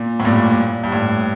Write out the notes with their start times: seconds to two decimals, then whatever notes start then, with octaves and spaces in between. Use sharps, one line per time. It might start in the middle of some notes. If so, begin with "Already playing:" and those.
Already playing: A#2
0.20 A2
0.25 G2 A#2
0.84 G2
0.92 A2